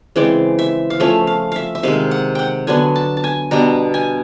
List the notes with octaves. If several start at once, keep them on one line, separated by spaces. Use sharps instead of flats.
C#3 E3 G#3 C4 D5
E5
F5
F3 A3 C#4 E5
F5
E5 F5
E5
C3 D#3 G#3 F5
F#5
F#5 G5
D3 F#3 B3 D4 G#5
A5
A5
G#5
B2 G3 B3 D4 A#5
G#5